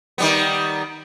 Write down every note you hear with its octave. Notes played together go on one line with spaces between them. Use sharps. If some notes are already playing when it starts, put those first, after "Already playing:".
D#3 G3 B3